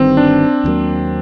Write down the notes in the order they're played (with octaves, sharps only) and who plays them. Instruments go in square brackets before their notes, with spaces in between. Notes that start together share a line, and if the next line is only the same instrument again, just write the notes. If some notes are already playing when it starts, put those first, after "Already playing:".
Already playing: [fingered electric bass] G1 G2 D#3 [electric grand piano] C4
[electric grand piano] D4
[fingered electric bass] D#2 D3 F#3 A#3